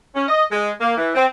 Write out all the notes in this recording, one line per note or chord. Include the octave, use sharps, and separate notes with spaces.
C#4
D#5
G#3
A#3
E3
C4